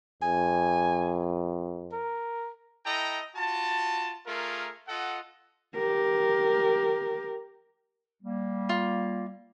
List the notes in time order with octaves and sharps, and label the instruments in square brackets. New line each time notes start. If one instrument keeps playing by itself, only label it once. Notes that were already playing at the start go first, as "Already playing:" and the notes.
[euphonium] F2 [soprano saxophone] G#5
[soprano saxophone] A#4
[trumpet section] E4 A4 D#5 G5 A#5
F4 F#4 A5
A3 F4 G#4 A#4
F4 A4 D#5 F#5
[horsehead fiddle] G4 A#4
[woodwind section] G3 A#3
[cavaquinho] F4